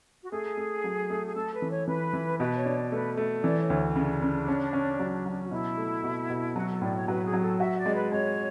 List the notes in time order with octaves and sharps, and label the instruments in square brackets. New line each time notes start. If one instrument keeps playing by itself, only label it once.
[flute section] F#4
[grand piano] A3 [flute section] G#4
[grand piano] A3
F#3
A3
[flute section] G#4
[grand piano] A3 [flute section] A4
[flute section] B4
[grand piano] E3
[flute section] C#5
[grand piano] E3 [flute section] B4
[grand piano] E3
[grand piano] B2 [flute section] B4
[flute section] C#5
[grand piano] D4
[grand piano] A3 [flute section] B4
[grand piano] A3
[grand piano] E3 [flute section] D5
[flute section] C#5
[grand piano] D2
[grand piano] C#3 [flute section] D4
[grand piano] C#3
C#4
C#4
F#3
F#3
[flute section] F#4
[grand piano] B2 [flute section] E4
[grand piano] A3
B2
B2
[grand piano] F#3 [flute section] F#4
[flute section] A4
[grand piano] A2 [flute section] D5
[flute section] C#5
[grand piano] F#3 [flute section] B4
[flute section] G#4
[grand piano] F#3
[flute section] A4
[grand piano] F#4 [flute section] E5
[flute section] D5
[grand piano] G#3
[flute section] B4
[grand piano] G#3 [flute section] C#5